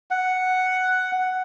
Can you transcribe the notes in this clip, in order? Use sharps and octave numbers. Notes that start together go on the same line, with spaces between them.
F#5